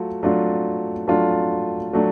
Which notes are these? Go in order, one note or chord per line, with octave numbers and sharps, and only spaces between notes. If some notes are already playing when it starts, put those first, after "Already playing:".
Already playing: F#3 A3 F4
F#3 A3 D4 F4
F#3 A3 D4 F4
F#3 A3 D4